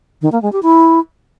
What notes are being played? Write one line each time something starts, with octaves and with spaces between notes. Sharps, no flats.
D#3
A#3
G#3
G4
E4